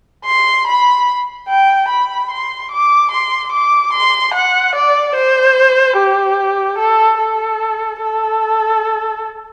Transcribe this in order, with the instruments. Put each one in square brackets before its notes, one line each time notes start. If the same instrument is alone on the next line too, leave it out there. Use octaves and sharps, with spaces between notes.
[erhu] C6
B5
G5
B5
C6
D6
C6
D6
C6
F#5
D5
C5
G4
A4
A4
A4